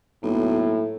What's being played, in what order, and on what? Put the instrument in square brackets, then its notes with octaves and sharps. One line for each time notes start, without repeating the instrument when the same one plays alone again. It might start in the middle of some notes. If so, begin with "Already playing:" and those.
[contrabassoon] B1 [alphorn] A2 [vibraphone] A#3